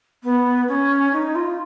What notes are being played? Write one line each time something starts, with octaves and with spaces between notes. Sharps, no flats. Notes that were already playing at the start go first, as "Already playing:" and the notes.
B3
C#4
D#4
F4